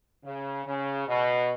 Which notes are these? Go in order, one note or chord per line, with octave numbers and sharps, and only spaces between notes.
C#3
C#3
B2